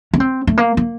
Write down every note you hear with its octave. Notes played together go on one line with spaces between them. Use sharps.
C#4
C4
A3
A#3
A#3